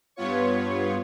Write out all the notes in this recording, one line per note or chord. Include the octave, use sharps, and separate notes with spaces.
G2 B3 F4 C#5 C#6